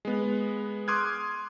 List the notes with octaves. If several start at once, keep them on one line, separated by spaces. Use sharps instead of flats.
G#3 B3
C6 D6 D#6 F6 F#6 G#6